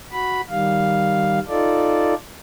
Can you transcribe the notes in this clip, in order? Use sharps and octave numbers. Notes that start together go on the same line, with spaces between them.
F#4 B5
D#3 G3 F5
D#4 F4 A4 D5